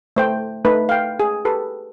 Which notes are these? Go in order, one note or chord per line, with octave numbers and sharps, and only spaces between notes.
A3 C5 G5
A3 D#4 B4
F5 G5
G#4
G4 A4 B4